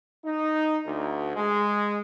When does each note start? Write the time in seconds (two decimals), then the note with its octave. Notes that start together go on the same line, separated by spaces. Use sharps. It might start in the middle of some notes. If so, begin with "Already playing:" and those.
0.25 D#4
0.86 D2
1.36 G#3